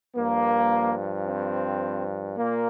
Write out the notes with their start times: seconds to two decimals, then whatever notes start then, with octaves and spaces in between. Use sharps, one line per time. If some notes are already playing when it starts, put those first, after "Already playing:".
0.16 G2 F3 A#3
1.27 C4
2.37 A#2 A#3